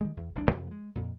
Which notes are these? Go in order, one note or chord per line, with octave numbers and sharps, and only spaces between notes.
D#3 G3 G#3
E2
E1 C2 C#3 D4
F2 C3 F3
G#3 B3
F2 A#2